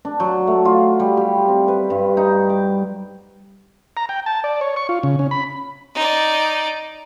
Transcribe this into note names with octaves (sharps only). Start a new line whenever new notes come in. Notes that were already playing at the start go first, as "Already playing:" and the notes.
D4
F#3
A3
F4
G3
G4
C4
B4
G2
D#4
D6
A#5
G5
A5
D5
C#5
C#6
F4
C#3
C#4
B5
D#4 D5